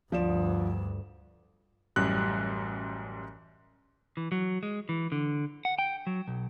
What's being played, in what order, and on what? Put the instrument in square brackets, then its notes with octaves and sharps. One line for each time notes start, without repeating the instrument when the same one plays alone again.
[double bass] D2 G2 [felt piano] F3 D5 E7
[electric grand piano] A1 F#2 G3 F#6
[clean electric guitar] E3
F#3
G#3
E3
D3
F#5
G5
F#3
B1